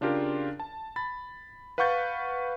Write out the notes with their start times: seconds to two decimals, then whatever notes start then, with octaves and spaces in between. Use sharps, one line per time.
0.01 C#3 D4 F4 G4 A#4
0.60 A5
0.96 B5 A6
1.78 B4 F5 F#5 C#6 G6 A6